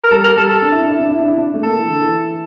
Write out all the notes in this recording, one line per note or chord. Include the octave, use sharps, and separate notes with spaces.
A#4
G3 A4
A#4
G3 A4
A4
D4
E4
D4
E4
D4
E4
D4
E4
D4
A3
A#3 A4
E3
D3
E3